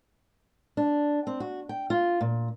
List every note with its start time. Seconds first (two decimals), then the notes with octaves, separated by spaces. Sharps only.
0.77 D4
1.27 C4
1.40 F#4
1.69 G5
1.90 F4
2.21 A#2